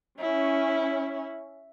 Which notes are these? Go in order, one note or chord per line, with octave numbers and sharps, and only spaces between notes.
C#4 E4